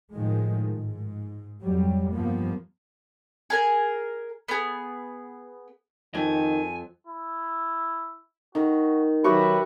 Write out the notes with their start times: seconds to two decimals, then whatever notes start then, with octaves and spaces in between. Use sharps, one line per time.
0.13 A2 D#3 F3 G#3
0.74 G#2
1.61 F2 F#3 G3
2.13 G2 F3 A#3 B3
3.50 G#4 A#4 G#5
4.48 B3 G#4
6.15 F2 D#3 G#5
7.07 E4
8.55 D#3 F#4
9.24 D#3 F#3 F#4 G4 B4 E5 C#6